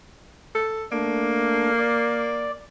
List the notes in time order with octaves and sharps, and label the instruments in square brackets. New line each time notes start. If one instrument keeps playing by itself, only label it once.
[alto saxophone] A4
[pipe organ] A3 D4 [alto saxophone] A#3
[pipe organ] D5